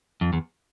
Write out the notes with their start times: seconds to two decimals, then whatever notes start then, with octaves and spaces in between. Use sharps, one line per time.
0.21 F2
0.33 E2